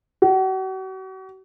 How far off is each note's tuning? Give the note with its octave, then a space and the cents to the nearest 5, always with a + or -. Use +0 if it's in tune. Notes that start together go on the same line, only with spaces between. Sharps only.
F#4 +40